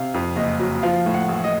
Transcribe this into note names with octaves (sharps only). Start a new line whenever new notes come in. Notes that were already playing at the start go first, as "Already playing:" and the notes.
Already playing: C3 F5
F2
F#1 D#5
F#3
F3 F5
A2
F#5
A1
D#5